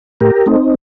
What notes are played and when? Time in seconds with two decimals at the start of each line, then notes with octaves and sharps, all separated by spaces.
0.21 A2 G4 A#4
0.46 A3 C4 D#4